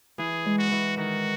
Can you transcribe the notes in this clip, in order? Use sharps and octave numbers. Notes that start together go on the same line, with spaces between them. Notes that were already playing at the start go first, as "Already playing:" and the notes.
E3 G#4
G#3
F#4
E3
D#3 F#4